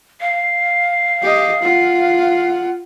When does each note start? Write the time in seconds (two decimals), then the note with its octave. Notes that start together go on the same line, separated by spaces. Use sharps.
0.21 F5
1.22 G4 D#5
1.62 F4 F#5